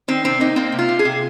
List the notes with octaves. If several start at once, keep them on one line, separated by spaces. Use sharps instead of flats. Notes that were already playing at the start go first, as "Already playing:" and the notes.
D#3 C4
C3 C4
A#3 D#4
A#3 C4
C3
F4
C3
G#4
C3